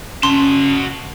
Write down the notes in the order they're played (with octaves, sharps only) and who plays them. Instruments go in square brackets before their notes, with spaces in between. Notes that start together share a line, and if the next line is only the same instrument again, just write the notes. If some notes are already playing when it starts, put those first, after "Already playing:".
[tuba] C#4 [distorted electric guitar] F#4 A5 [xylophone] C6